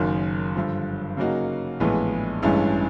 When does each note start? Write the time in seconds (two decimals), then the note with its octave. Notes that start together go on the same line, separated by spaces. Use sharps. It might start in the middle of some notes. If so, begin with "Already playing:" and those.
Already playing: F#1 F#2 D#3
0.55 G2 D3 F3
1.17 C#3 F#3 A#3 D#4 F#4
1.80 A#1 A2 E3 G#3 B3
2.42 A1 G2 E3 G#3 C#4